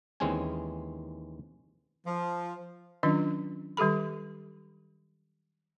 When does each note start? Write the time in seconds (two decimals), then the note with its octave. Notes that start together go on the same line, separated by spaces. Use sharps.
0.20 D#2 E3 G#3 C4 C#4 G#5
2.06 F3
3.03 D#3 F#3 C#4 D4 F4 D#5
3.77 D#3 G3 G4 A4 B5